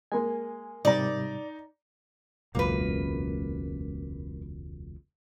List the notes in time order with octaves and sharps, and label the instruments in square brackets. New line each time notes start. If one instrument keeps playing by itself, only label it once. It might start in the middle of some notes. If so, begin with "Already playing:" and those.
[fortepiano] G#3 A#3 [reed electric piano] G#5
[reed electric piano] G#2 C3 G3 [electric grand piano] D#4 A#5 [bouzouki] D5
[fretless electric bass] E1 C#2 F#2 [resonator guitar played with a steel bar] A#3 B4